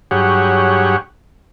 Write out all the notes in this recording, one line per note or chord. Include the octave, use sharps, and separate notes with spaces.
G2 F#3 G4 G#4 C#5 F#5